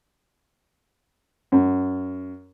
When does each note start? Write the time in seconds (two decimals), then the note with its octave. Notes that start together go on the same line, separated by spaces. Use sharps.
1.52 F#2